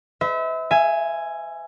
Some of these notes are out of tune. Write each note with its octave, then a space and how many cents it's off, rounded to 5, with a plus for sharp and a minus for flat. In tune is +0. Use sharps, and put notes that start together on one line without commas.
B4 +45 E5 -30
E5 +30 G#5 +0